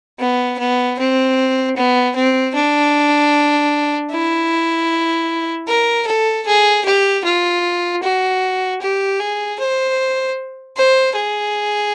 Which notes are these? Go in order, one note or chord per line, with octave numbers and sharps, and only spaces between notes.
B3
B3
C4
B3
C4
D4
E4
A#4
A4
G#4
G4
F4
F#4
G4
G#4
C5
C5
G#4